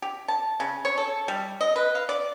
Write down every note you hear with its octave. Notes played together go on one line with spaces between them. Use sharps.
G4
A5
C#3
C#5
A4
G3
D#5
B4
F5
D5